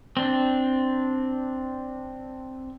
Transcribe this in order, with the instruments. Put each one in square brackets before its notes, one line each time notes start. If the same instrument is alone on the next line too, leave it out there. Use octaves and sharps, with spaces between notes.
[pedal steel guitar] C4 D4